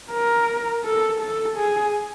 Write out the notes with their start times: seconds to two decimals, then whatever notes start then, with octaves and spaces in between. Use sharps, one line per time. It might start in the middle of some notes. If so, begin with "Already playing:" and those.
0.11 A#4
0.84 A4
1.20 A4
1.57 G#4